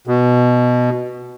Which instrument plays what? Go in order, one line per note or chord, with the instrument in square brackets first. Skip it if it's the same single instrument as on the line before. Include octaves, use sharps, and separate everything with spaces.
[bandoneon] B2